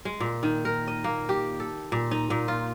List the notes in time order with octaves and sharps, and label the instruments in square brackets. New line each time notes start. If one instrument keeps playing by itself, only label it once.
[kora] G#3
A#2
D#3
A#4
D#5
A#3
G4
A4
A#2
D#4
A#2
F4